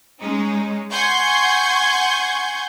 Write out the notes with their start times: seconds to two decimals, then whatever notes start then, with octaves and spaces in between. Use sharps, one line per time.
0.20 G#3 C#4 D#4
0.91 F#5 G#5 C6 C#6 G6 G#6